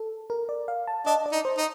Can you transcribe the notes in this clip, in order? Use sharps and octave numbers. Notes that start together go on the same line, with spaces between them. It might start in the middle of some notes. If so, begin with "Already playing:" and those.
Already playing: A4
A#4
D5
F5
A5
D4 D#5
D5
D#4
C5
D#4